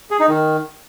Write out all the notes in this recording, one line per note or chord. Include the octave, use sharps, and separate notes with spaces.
G#4
D#4
D#3